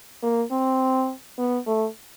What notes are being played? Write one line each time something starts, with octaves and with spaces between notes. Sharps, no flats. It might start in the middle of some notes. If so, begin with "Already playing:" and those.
A#3
C4
B3
A3